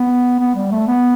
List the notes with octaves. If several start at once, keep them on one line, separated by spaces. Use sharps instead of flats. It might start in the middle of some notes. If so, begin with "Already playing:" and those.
Already playing: B3
B3
G3
A3
B3